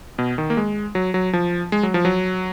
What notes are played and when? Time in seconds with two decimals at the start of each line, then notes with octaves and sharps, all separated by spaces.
0.19 B2
0.38 D#3
0.50 A#3
0.57 G#3
0.95 F#3
1.14 F#3
1.33 F3
1.72 G#3
1.83 F#3
1.94 F3
2.05 F#3